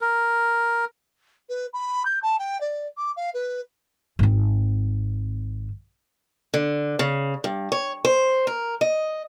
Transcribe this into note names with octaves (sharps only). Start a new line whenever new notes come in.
A#4
B4
B5
G6
A5
G5
D5
D6
F5
B4
G#1 C4
D3
C#3
G2
C#5
C5
A#4
D#5